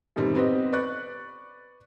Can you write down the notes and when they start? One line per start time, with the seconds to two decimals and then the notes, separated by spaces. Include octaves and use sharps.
0.16 F#2 B2 D#3 G3 C4
0.35 B3 C4 G4 B4 D#5
0.72 B4 D5 C#6 F#6